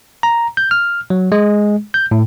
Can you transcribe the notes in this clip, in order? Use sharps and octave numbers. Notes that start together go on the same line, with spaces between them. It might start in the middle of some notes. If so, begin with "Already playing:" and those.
A#5
G6
F6
F#3
G#3
G6
A2